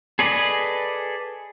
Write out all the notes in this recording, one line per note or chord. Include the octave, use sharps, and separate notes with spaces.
G#4 A4 B4 D5 D#5